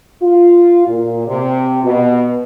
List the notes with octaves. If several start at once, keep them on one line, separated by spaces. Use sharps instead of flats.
F4
A#2
C3
B2